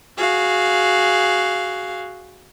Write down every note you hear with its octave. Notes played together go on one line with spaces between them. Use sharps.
F#4 G#4 F5